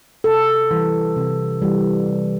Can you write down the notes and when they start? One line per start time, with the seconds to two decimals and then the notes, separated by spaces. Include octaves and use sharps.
0.24 C3 A4
0.71 E3 G3
1.16 C3
1.62 E3 G3
2.08 C3